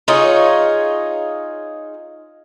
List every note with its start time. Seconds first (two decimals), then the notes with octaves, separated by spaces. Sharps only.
0.08 D#4 F4 G#4 C#5